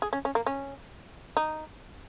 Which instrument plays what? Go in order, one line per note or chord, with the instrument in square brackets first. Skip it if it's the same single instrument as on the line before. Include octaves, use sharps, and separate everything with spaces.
[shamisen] G#4
C#4
C#4
A#3
C#4
D#4